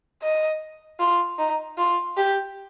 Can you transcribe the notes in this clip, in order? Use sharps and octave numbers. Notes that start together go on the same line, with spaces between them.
D#5
F4
D#4
F4
G4